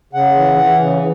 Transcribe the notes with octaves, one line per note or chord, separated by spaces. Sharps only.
C#3 F#5
E3
E3
C#3